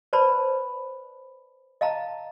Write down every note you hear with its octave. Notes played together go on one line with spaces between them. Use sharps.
B4 C5 D5 A5 B5
D#5 F5 A5 A#5